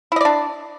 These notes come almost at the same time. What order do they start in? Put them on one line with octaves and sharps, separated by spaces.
E4 D#5 D5 D4